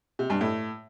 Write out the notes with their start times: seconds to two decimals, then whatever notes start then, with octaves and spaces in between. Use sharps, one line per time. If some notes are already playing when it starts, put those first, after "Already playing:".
0.19 C3
0.30 G2
0.41 A2